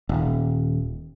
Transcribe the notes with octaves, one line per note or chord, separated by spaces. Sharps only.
D#1